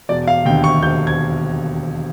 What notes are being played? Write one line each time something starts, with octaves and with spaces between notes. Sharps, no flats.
E1 D5
F5
D#2 D3 G5
C#6
E1 G6
G#6